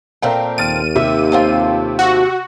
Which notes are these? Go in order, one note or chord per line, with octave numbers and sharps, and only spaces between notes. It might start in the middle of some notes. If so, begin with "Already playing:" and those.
A#2 A3 C4 A#4 F5 G5
D#2 F6 A6 D7 D#7
C3 E5
A3 C4 F4
F#4